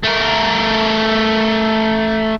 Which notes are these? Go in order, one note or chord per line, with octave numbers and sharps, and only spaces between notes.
A3 A#4